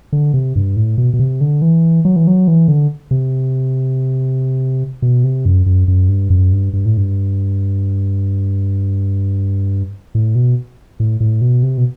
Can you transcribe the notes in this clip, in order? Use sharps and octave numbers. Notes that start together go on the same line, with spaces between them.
D3
C3
G2
A2
B2
B2
C3
D3
E3
F#3
E3
F#3
E3
D3
C3
B2
C3
F#2
F#2
F#2
G2
F#2
G2
G2
A2
G2
A2
B2
A2
A2
B2
C3
B2